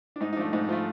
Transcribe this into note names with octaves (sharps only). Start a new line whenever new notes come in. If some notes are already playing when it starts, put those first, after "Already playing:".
D4
G#2 D#4
D#4
F3 A3 D4
G#2 D#4
F3 A3 F4